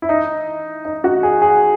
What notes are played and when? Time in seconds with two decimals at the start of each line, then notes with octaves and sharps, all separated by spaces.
0.02 E4
0.09 D#4
0.85 D#4
1.04 F#4
1.23 G#4
1.42 G#4